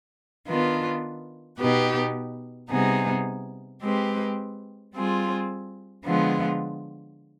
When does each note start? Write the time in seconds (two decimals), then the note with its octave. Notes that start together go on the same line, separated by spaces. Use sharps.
0.48 D#3 B3 D4 F4 B4
1.59 B2 B3 D#4 G4 B4
2.70 C3 G3 B3 D#4 G#4
3.82 G#3 C4 G4 B4
4.94 G3 C4 F4 G#4
6.04 D3 F3 G#3 B3 F4